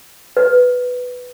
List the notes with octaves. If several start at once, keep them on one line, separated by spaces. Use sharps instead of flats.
B4